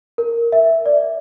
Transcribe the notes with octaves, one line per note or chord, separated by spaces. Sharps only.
A#4
E5
D5